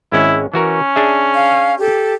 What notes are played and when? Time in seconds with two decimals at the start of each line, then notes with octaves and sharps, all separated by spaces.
0.12 G#1 G#3 C#4 E4
0.54 E3 C#4 F#4 A#4
0.96 D4 G#4 E5
1.35 F5
1.79 G4 A4